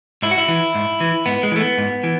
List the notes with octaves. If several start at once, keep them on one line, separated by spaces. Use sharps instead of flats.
G#2 E4
F#4
E4
E3
G#2
E3
G#2 B3
G#3
E3 A3
B3
G#2
E3